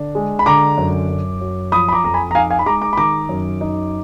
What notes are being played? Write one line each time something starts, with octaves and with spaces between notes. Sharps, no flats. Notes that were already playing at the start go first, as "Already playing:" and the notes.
Already playing: D3 D4
G#3
B5
D3 A#5 D6
F#2
F#2
F#3
F3 B5 D#6
B5
A#5 D6
F2 A#5
G#5 B5
A#5
D#4 F5 G#5
F5 G#5
B5
G#3 A#5 D6
A#5 D6
B5
D#3 A#5 D6
F#2
D#4